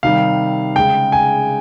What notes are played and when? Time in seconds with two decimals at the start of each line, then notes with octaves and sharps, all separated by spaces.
0.03 C3 D#3 G3 F5
0.76 C#3 G#3 G5
1.12 G#5